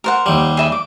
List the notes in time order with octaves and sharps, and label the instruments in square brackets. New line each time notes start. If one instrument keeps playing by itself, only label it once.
[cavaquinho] A#4 C5 F#5
[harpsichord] D#2 G3
[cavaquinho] G#4 E5 B5
D6